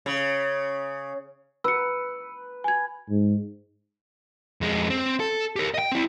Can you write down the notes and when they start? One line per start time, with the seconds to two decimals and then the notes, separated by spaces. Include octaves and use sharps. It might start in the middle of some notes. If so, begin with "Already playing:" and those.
0.06 C#3
1.64 B4 E6 C#7
2.64 G#5 G#6
3.09 G#2
4.61 F2 G#3
4.90 C4
5.20 A4
5.56 G4 A#4
5.74 D#5 G5
5.92 C4 E4